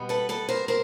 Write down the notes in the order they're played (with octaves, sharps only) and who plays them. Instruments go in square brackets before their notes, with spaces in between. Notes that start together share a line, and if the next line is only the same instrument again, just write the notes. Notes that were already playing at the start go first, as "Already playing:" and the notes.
Already playing: [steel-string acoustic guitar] B2 G3 B3
A4 B4
A4 B4
A#4 C5
A#4 C5